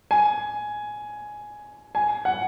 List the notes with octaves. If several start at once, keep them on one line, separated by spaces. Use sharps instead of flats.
G#5
G#5
F#5